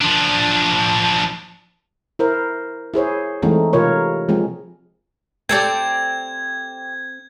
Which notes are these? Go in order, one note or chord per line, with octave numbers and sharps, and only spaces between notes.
F3 D4
E4 A#4 C5
E4 G#4 C5 C#5
E3 G#3 A3 C4 D#4
C3 F4 A#4 B4 C#5
F3 G#3 C4
C4 G4 A4 D5 G5 G#6